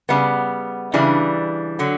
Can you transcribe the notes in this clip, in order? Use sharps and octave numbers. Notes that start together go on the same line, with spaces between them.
C#3 G3 B3
C#3 E3 G3 D4
D3 F#3